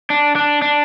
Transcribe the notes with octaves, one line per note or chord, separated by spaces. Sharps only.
D4
D4
D4